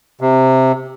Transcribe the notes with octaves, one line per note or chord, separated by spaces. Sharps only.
C3